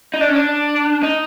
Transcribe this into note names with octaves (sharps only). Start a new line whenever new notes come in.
D#4
D4
C#4
D4
D#4